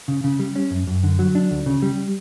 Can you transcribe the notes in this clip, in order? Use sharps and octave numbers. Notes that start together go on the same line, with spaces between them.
C#3
C#3
G3
C#4
F#2
F#2
D3
F#3
D4
D2
C#3
G3